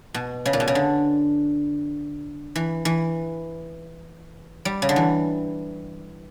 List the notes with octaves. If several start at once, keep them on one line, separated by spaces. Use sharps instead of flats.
B2
C#3
A#2
B2
C#3
D3
E3
E3
G3
C#3
D3
E3